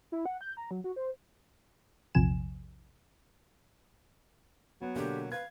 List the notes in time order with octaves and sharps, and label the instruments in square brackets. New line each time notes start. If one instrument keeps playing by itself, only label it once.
[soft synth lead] E4
F#5
G6
A#5
F#3
F#4
C5
[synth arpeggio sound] A#1 E2 C3 F3 G#5 E7
[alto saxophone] F#3 [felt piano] B3
[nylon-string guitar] B2 A#3 [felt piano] D3 [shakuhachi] G4
[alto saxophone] B4 [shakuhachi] F5 [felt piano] G#6